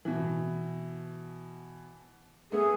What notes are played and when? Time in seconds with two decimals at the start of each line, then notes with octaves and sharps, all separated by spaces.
0.05 B2 E3
2.52 A3 B3 G#4